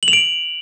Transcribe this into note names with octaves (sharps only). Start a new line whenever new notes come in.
F#7
F7
D7